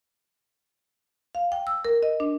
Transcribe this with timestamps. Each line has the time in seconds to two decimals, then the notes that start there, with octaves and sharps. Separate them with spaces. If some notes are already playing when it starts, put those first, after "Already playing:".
1.35 F5
1.52 G5
1.67 E6
1.85 A#4
2.03 D#5
2.20 D4